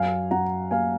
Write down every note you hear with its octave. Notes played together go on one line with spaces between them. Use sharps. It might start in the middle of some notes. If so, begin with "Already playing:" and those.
Already playing: F#2 F5 G#5
F#2 F#5 A#5
A#3 F5 G#5